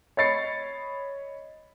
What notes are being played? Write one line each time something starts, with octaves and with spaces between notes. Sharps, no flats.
C#5 D#5 B5 A6 C7 C#7